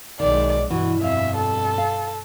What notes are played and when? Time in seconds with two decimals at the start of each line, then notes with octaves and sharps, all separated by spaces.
0.20 B1 D#3 G#3 D5
0.70 G2 B2 E3 F#4
1.01 F2 E5 F5
1.37 A4
1.78 F5